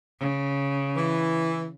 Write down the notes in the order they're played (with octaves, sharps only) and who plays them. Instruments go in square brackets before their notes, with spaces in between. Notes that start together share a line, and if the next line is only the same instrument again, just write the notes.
[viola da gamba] C#3
[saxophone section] E3